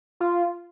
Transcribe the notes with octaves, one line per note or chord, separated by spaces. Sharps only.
F4